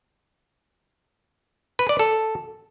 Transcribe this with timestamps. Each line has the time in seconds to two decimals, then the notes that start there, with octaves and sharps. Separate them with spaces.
1.79 B4
1.89 D5
1.99 A4